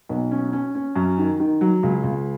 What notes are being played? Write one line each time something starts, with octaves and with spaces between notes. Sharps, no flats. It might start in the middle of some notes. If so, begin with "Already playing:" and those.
B1
C#4
C#4
C#4
F#2
D#3
D#3
F#3
C#2
C#2